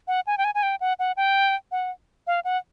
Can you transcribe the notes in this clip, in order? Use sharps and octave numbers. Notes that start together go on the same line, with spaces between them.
F#5
G#5
G5
G#5
G#5
G5
F#5
F#5
G5
F#5
F5
F#5